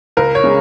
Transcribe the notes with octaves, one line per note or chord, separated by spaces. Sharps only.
C#2 A#4
C#5
C#3 G#3